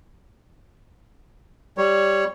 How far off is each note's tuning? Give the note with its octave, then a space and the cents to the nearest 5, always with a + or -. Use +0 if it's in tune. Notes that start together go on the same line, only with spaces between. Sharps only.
G3 +0 C#5 +0